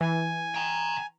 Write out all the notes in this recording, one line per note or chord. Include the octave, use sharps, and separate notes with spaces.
E3 G#5
G5 A#5